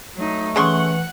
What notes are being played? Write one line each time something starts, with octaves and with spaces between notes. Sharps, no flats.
F#3 A3 D#4
C#3 E3 F#5 C6 C#6